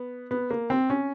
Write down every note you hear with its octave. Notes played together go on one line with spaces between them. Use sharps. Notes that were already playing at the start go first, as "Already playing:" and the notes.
Already playing: B3
B3
A#3
C4
C#4